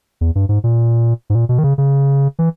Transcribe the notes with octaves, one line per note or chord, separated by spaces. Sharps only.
E2
G2
G#2
A#2
G#2
A#2
B2
D#3
C#3
C#3
E3